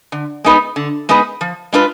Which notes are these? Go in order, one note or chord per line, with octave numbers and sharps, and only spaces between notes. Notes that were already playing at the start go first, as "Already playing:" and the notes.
D3
G#3 B3 D#4 B4
D3
G#3 B3 D#4 B4
F3
G#3 D4 F4 B4